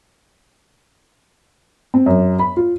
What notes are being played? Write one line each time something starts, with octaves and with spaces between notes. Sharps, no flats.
C4
F#2
B5
F4